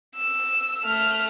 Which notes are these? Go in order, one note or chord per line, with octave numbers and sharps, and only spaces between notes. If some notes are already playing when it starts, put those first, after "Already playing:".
E6
A3 F6